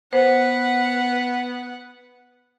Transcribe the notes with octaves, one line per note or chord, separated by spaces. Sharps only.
B3 B4 C5 F#5